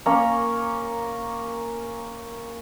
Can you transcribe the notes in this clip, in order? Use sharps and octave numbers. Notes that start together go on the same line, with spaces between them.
A#3 C#4 A#4 A#5